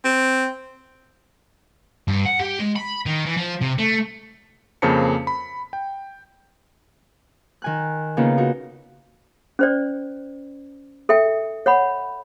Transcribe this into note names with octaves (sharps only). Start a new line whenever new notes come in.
C4
G2
F#5
G4
G#3
B5
D#3
E3
F3
C3
A3
F2 C#3 A#3 C5 A5 C#7
B5
G5
D#3 G#5 F#6
C#3 A#3 B3 D#4 F4 B4
D#4 F#4
C#4 C5 D5
A4 E5 G5
C#5 F#5 B5